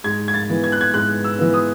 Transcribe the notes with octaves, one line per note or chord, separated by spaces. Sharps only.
G#2 G#6
G#6
A6
E3 B3
G#6
F#6
G#6
G#2 F#6
E6
E3 B3
D#6